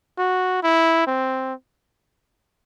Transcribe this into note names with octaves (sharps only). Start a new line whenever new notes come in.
F#4
E4
C4